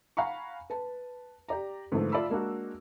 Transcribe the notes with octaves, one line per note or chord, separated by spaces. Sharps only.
F5 F#5 G#5 A#5 B5 C#6
B4 A5
G4 D5 A#5
G#2 D3 E3 F3 A3
F4 D5 E5 A5 B5 E6
G#3 A#3 D4 F#4